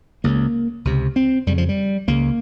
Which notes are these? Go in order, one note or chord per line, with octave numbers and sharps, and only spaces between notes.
C#2 C#3 A#3
C#2 C3
C4
F2 C#3 G3
F3
G3
C#2 C#3 A#3